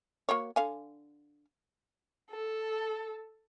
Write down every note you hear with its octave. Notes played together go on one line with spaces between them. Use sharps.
A#3 F#4 C#5
D3 F5 G#5
A4